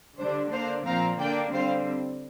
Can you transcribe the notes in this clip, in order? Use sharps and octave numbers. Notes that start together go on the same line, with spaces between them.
D3 G3 D4 C5
D3 A#3 D4 C5 F5
A#2 F3 C4 F5 A#5
D3 A#3 D4 D5 G5
D3 G3 C4 C5 F5